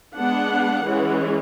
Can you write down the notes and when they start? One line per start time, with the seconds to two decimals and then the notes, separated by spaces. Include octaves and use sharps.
0.16 G#3 B3 D4 F#5
0.85 E3 G#3 C#4